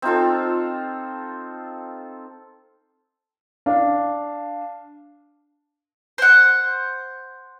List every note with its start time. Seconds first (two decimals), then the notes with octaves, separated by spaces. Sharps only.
0.02 C4 D#4 F4 A4
3.66 D4 F5
6.18 C5 F#5